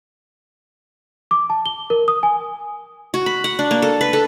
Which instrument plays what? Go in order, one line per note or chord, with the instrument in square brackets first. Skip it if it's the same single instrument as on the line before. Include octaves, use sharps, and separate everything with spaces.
[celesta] D6
A5
G7
A#4
D#6
G#5
[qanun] F#4
B5
F#5
D4
A#3
A4
B4
A4